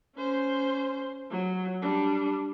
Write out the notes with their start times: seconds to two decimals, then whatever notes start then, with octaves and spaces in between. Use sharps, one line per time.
0.16 C#4 C5
1.31 F#3
1.82 G3 D4